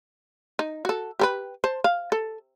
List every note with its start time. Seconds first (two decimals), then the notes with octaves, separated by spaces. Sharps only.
0.59 D#4
0.85 F#4 A4
1.19 G4 A4 B4
1.64 C5 A5
1.84 F5
2.12 A4